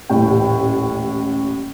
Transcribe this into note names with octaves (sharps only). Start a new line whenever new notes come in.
D#1 A1 A2 C#3 G5